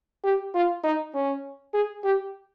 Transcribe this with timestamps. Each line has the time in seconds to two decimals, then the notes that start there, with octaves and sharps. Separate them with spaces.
0.24 G4
0.54 F4
0.84 D#4
1.14 C#4
1.74 G#4
2.04 G4